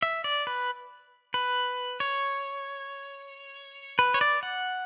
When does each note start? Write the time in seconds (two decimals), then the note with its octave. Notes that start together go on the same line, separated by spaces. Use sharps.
0.02 E5
0.24 D5
0.47 B4
1.34 B4
2.00 C#5
3.99 B4
4.14 C#5
4.21 D5
4.43 F#5